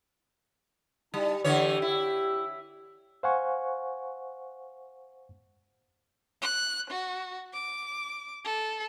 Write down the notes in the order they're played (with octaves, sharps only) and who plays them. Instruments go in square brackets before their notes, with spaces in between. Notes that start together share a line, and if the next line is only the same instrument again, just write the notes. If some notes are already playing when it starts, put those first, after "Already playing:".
[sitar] G3 [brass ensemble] D#4 E4 A5
[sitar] D3 E3 C#5 [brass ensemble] G4
[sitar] E4
[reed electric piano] C5 F5 F#5 G#5 C#6
[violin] F#6
F#4
D6
A4